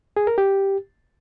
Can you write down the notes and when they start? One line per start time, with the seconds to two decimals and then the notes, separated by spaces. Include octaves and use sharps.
0.17 G#4
0.27 A#4
0.38 G4